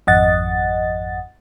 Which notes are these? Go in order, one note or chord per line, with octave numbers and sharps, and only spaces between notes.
G#1 F2 D#5 F#5 A6